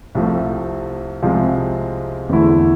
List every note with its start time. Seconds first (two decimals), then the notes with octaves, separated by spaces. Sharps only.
0.15 C2 C3 F3 A3
1.22 C2 C3 F3 G#3
2.29 E2 D3 A3 E4